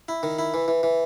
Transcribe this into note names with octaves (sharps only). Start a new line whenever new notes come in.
E4
D#3
E4
E3
E3
E3